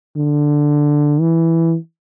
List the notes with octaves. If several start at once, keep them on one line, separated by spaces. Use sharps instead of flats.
D3
E3